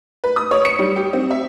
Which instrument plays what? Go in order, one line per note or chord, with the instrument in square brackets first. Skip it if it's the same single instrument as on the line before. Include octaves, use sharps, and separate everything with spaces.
[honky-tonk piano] B4
D#6
C#5
C#7
G3
G4
C4
E5